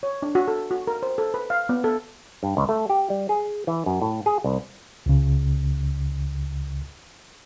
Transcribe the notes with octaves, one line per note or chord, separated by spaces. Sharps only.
C#5
D4
F#4
A4
F#4
A#4
C5
A4
B4
F5
B3
A4
G2
C#2
A3
G4
G3
G#4
E3
F#2
A2
G#4
C2
C#2 C#3